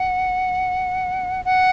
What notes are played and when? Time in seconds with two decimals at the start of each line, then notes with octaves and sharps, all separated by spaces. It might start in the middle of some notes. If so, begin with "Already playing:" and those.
Already playing: F#5
1.45 F#5